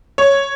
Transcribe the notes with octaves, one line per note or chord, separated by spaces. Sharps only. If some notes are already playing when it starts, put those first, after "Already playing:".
C#5